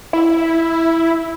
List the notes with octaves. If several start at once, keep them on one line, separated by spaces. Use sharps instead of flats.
E4